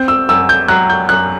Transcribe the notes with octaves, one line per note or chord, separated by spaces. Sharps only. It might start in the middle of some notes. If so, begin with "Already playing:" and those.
Already playing: C4 G6
E6
F#2 E6
G6
F#3 F#6
G6
F#2 F#6